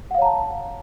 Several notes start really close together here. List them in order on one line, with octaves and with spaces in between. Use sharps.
F#5 F5 C#5 A#5 A5